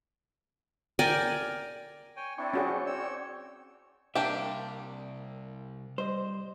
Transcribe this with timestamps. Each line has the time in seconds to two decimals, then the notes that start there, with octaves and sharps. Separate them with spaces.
0.99 A#4 D5 G5 G#5
2.16 C#5 G5 G#5
2.38 C4 D4 E4 D5 G5 C#6
2.54 C#4 F#4 G#4
2.86 C4 C#5 E6
4.15 C2 C3 A#3 D4 G4 E5
5.98 G3 C5 D#5